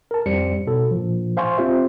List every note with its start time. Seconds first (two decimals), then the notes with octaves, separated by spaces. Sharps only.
0.11 A#4 A5
0.26 F2 G3 C5 C#7
0.67 B2 A4
0.91 A#2 F3
1.37 C5 F5 G#5 C6 C#6
1.58 C4 F4 G4 C5 E5